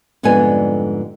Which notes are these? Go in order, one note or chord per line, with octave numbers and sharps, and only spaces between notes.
F2 G#2 D3 G3 B3 G#5